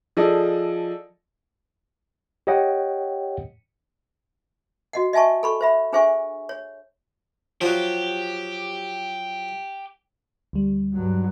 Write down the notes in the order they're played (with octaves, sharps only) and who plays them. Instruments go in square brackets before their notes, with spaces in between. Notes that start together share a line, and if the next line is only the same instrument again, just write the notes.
[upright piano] F3 G#4 A4 D5 D#5
[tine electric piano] G4 C#5 D#5 F#5 G5
[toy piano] F#4 D#5 F#5
D#5 E5 G#5 A5 C#6
A4 B5 C#6
C5 E5 B5
D4 G#4 C5 E5 G#5 C#6
C#5
[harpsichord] F3 F#3 [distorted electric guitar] G4
[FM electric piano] D2 G3
[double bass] G2 F#3